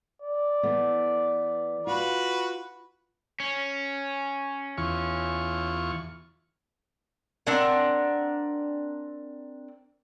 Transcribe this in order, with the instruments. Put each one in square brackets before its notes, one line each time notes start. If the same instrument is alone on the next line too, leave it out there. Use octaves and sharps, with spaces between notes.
[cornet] D5
[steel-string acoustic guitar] E3 A3 B3
[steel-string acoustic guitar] F4 [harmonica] F#4 B4
[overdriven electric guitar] C#4
[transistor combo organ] E2 F4 C#6
[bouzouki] C4 D4 A#4 F#5